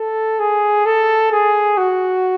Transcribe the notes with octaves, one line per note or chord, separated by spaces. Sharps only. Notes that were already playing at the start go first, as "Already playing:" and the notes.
Already playing: A4
G#4
A4
G#4
F#4